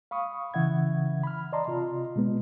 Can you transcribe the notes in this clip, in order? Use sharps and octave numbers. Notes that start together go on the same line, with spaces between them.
F5 B5 C#6 D#6
C#3 E3 E5 F#5 G#6
B5 F6
D5 D#5 A5 A#5 C6
C3 F4 D#5
B2 G#3 B3